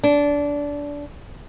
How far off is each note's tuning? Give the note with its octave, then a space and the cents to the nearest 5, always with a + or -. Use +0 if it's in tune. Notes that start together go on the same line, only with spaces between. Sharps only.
D4 -20